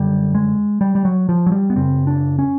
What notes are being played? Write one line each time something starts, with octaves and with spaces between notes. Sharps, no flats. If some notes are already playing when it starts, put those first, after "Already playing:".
Already playing: F#2 D3 G3
G#3
G3
G3
F#3
F3
F#3
G3
B3
F#2 C#3 C4
D4
C#4